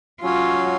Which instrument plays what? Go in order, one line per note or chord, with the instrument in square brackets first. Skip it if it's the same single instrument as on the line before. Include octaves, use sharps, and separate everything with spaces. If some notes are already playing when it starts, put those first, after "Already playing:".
[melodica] F#3 C#4 F#4 C#5 [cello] F4